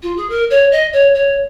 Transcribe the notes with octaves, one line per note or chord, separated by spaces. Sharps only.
F4
G#4
A#4
C#5
D#5
C#5
C#5